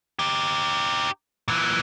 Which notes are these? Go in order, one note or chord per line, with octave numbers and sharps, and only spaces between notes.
D#4 G4
A#2 E3